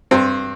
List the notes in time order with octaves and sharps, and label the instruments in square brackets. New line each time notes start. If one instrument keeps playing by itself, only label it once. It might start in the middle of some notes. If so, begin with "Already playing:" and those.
[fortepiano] G2 C4